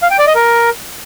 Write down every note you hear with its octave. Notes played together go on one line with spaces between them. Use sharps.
F5
G5
D5
D#5
A#4